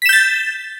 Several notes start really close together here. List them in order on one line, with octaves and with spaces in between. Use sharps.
B6 E7 G6 A6